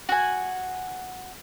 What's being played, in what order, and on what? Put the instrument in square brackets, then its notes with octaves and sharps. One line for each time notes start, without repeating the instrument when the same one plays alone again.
[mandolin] F#4 G#5